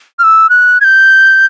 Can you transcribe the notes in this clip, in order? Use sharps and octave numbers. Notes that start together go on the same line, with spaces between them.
F6
E6
F#6
G#6
G6